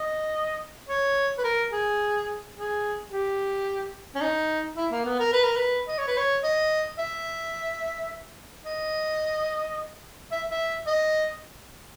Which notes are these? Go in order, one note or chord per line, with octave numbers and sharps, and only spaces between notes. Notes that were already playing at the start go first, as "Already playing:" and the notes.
Already playing: D#5
C#5
B4
A#4
G#4
G#4
G4
C#4
D#4
E4
A#3
B3
A#4
B4
A#4
B4
D#5
C#5
B4
C#5
D#5
E5
D#5
E5
E5
D#5